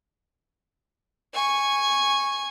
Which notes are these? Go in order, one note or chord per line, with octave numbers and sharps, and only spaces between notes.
G#5 C#6